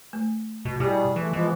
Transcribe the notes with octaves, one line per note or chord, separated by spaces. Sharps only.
A3
B2
B2 G3 E4 G4 G#4
E3 A3
E3 F3 G#3 B3